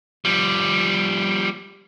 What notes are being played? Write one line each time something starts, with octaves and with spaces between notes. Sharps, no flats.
F3 G3